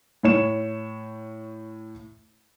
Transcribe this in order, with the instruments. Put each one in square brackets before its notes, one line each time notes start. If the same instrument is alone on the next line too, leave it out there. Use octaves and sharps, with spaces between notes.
[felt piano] A2 C#5 E7